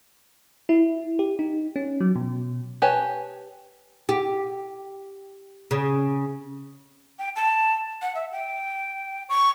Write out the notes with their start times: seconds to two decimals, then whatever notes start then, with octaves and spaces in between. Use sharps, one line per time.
0.69 E4
1.19 G4
1.39 D#4
1.76 C#4
2.01 F#3
2.16 B2
2.82 G4 B4 C#5 G#5 A5
4.09 G4
5.71 C#3
7.19 G5
7.36 A5
8.02 F#5
8.15 E5
8.32 G5
9.29 C#6